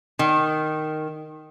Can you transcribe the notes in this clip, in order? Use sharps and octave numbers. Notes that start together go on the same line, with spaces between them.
D#3